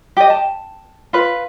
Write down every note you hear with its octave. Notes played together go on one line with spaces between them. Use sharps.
G4 D#5
A5
F4 B4